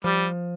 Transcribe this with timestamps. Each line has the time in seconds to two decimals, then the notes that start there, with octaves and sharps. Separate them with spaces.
0.04 F3 G3